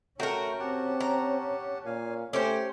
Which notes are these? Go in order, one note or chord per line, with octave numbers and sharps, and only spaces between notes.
A3 C#4 F#4 A#4 G5 A#5
C4 G4 F#5 A5
A#5
A#2 F5 G#5
A3 C#4 G4 C5 D6